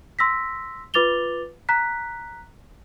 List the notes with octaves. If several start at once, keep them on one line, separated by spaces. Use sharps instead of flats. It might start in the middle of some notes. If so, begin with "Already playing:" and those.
C6 E6 A#6 B6
F4 B4 D6 A6 F7 G7
A#5 F#6 B6